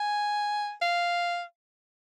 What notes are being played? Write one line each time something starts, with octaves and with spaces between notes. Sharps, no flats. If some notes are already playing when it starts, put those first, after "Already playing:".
Already playing: G#5
F5